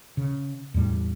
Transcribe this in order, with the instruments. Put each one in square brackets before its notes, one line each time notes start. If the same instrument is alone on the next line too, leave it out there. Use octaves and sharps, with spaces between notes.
[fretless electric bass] C#3
E2 A2 G3